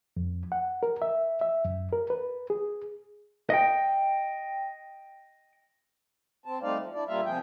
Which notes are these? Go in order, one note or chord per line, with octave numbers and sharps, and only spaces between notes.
F2
F#5
A#4
E5
E5
F#2
A#4
B4
G#4
D#5 G5
C4 A5
G3 A3 C4 D#4 D5 F5
F3
D4 E4 D5
A#2 G3 A#3 F4 E5 F5
C3 F3 G#4 G5